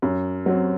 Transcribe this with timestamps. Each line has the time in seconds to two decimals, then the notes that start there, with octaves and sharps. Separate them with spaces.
0.02 F#2
0.46 F#3 C4